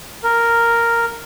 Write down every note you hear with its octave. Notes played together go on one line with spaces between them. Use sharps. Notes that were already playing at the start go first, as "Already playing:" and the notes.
A#4